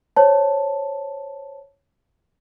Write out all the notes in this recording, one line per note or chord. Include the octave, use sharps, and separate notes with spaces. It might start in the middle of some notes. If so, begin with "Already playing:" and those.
C5 C#5 A5